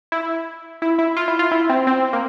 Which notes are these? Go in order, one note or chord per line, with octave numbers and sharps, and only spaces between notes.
E4
E4
E4
F4
E4
F4
E4
C4
C4
A#3